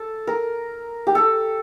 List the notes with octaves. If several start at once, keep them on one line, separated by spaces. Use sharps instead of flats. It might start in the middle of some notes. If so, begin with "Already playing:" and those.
Already playing: A4
A#4
G4
A4